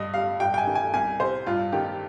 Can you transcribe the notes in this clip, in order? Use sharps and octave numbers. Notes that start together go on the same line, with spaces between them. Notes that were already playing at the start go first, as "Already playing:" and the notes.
Already playing: G2 D#5
G3 F5
G2 G5
G5
G#5
D#3
G#5
C2 G#5
C3 C5
G2 F4
D#3 G4